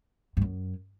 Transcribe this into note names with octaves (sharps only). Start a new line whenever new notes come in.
G2
F#2